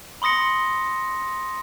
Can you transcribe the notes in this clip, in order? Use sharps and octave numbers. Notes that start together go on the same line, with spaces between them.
B5 C6 D#6 A#6 C#7